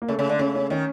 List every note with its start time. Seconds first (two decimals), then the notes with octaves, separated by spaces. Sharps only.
0.02 A#3
0.08 C#3 A3
0.19 C#3
0.29 D3
0.39 C#3 C#4
0.56 C#4
0.70 D#3 C#4